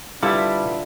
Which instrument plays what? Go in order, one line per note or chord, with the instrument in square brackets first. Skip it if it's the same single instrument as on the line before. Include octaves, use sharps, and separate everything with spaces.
[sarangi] D3 [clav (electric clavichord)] G3 [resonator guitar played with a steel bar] E4 A4 B4 [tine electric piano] F4 E5